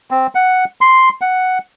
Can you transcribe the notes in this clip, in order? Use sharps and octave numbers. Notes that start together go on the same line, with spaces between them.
C4
F#5
C6
F#5